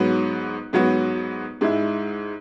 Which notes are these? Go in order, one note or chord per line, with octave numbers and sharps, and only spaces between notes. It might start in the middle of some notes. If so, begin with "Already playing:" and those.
Already playing: G#2 F#3 B3 F#4
G#2 F#3 B3 F#4
G#2 G#3 E4